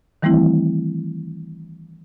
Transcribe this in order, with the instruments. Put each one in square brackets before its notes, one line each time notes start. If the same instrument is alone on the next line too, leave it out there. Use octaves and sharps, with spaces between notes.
[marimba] D#3 E3 G3 A3 C4 E4